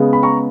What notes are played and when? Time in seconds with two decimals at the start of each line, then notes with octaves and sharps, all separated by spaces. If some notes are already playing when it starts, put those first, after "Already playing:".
Already playing: C#3 G#3 B3
0.13 B5
0.23 A#5 C#6